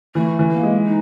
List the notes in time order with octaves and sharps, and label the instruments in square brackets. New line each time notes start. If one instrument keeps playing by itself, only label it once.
[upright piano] E3 [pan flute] A3
[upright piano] E3
[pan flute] A#3
[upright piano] G#3
[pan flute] D#4